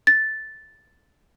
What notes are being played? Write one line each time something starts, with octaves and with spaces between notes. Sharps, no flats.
A6